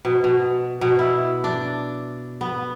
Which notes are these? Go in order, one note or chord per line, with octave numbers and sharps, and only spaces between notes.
B2
B2
B2
E4
D4
B3